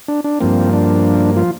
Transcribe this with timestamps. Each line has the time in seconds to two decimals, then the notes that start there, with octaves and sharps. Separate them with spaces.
0.08 D4
0.24 D4
0.41 G2 F3 A#3 C4
0.73 D4
1.36 F3 F4